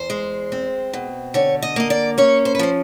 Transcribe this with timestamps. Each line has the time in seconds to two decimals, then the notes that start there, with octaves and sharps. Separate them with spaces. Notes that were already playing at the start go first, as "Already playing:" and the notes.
Already playing: E2 C5
0.10 G#3
0.52 C4
0.94 B2
1.34 D3 C#5
1.62 D#5
1.76 A#3 D#5
1.90 D5
2.18 C#4 C#5
2.45 C5
2.55 B4
2.59 F3 C5